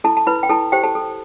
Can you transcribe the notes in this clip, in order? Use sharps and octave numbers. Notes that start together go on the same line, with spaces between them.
E4 A4 A5
A5
E4 B4 B5
G5
E4 A4 A5
G4 C5 G5
A4 A5
A4